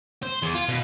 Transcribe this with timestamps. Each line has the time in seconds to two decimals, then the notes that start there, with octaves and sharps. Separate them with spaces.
0.23 C5
0.42 E2
0.54 F4
0.69 B2